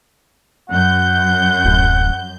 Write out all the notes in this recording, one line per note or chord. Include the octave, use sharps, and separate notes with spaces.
F#2 F#5 G6
D1